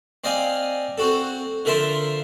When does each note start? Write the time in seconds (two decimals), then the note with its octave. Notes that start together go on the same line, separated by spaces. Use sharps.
0.24 C4 D5 D#5 F5 G#5
0.98 C4 F#4 A4
1.65 D3 F3 A#4 E5 A5 C6